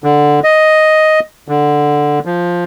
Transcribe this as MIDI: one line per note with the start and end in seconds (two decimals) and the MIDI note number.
0.04 0.40 50
0.44 1.20 75
1.48 2.19 50
2.25 2.64 53